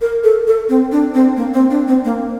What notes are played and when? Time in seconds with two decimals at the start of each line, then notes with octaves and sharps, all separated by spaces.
0.01 A#4
0.24 A4
0.47 A4
0.69 C4
0.92 D4
1.14 C4
1.37 A#3
1.54 C4
1.70 D4
1.88 C4
2.05 A#3